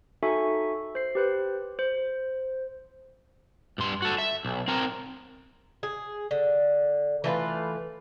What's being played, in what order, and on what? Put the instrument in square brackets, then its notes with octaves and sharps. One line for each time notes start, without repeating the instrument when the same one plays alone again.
[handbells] D#4 F#4 A4 E5 G#5 C#6
C5 C7
G4 B4 C5
C5
[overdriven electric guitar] G2 C6
F#4 A4
E5
B1
C4 A#4
[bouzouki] G#4
D3
E3 A3 F4 B4